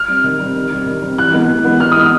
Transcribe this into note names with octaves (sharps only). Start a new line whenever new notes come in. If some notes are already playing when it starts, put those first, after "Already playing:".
Already playing: F6
G3 C4
D#3
G3 C4
D#3
G3 C4
D#3
G3 C4
E3 F#6
G#3 B3
E3
G#3 B3
E3 F6
D#6
G#3 B3